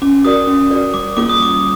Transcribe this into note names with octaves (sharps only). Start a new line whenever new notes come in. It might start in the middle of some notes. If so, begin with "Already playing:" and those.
C#4 D6
F#4 A#4 D5 D#6
C#4
F#4 A#4 D5
G3 D6
A#3 C#4 F4 G#4 D6
D#6
G3 D6